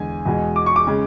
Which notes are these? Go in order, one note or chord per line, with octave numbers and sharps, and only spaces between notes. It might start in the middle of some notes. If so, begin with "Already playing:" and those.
Already playing: E2 D3 G#3 G#5
E2 B2 G#3
D6
C#6
D6
C#3 G#3